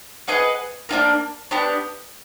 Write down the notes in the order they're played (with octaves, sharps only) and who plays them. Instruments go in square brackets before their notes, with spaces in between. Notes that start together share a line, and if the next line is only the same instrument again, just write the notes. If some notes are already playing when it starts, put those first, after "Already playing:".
[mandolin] G#4 B4 D#5 F#5
A#3 D4 F4 A#4
B3 D4 G4